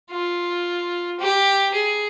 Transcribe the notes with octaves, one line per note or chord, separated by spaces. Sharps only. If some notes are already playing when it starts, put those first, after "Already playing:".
F4
G4
G#4